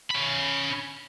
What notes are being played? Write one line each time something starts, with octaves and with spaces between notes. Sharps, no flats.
C#4 B5